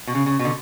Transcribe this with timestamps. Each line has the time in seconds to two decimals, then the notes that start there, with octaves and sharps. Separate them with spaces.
0.07 B2
0.15 C#3
0.26 C#3
0.39 B2
0.45 D3